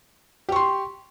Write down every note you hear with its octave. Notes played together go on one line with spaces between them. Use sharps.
G4 C6 C#6